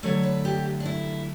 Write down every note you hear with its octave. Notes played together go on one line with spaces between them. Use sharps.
D3 F#3 A3 C#5
B4
G4
D4
E4